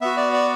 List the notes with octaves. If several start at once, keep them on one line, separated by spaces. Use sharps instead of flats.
B3 F#4 E5
D5
D5